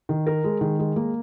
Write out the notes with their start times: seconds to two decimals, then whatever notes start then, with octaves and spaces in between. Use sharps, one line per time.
0.09 D#3
0.27 A#4
0.44 G#3
0.61 D#3
0.79 G#3
0.96 A#3